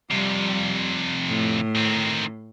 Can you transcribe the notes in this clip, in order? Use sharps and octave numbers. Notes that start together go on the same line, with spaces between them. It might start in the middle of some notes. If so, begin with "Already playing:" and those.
F2 C3 G3
A2
D#3 C4